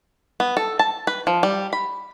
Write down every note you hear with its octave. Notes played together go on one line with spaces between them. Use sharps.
B3
A4
A5
B4
F3
G3
B5